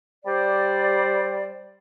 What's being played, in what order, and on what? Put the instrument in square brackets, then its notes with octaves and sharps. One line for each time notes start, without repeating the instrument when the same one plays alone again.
[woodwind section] G3 C5 D5